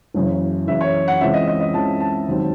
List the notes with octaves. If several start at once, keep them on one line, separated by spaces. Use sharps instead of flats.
F#1 F#2 C#3 E3
F#1 F#2 C#3 E3 E5
C#5
F#5
C#2 C#3 E3 C4 E5
D#5
D#5
D#5
C#2 C#3 E3 C4 A5
A5
E1 D#2 D#3 F#3 C4